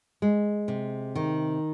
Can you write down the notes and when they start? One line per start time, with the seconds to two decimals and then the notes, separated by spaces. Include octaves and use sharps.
0.22 G#3
0.68 C3
1.15 D#3